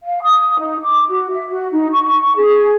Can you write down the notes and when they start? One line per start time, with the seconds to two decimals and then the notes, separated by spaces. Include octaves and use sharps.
0.03 F5
0.22 D#6
0.59 D#4
0.82 D6
1.08 F#4
1.31 E5
1.50 F#4
1.72 D#4
1.92 C#6
2.36 G#4